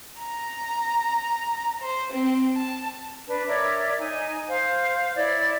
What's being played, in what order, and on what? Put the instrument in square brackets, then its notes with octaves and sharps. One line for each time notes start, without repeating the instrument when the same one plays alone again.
[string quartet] A#5
C5
C4
A5
[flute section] D4 B4
A#4 C#5 D5 E5
D#4 G#5
C5 F5
E4 C#5 D5